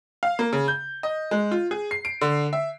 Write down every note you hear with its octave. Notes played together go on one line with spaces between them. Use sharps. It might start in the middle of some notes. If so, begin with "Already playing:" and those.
F5
A#3
C#3
G6
D#5
G#3
F4
G#4
C7
D7
D3
E5